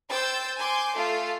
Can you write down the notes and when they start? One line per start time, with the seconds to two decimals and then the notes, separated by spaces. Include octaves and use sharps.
0.11 C5 G5 E6 G6 A6
0.58 G#5 C6 D6 G6
0.96 A3 F4 A4 C7